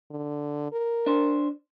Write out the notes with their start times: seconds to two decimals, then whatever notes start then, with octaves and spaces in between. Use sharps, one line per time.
0.11 D3
0.72 A#4
1.06 D4 C5